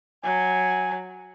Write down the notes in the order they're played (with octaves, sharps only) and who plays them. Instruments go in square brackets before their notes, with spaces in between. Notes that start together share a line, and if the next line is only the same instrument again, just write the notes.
[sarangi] F#3 [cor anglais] G#5